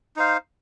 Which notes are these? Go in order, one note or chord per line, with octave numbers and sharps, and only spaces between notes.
D#4 C5 F5